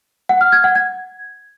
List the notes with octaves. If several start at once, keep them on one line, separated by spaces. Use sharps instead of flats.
F#5
F6
G#6
F#5
G#6